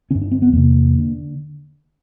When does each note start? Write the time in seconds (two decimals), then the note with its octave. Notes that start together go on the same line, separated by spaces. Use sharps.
0.11 G2 D3 C#4
0.22 D4
0.31 C4
0.42 B3
0.52 E2 C3 A#3
0.99 D3